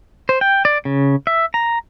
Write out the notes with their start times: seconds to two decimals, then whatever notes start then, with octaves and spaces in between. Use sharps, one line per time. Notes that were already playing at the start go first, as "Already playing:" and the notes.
0.29 C5
0.41 G5
0.65 D5
0.85 C#3
1.27 E5
1.54 A#5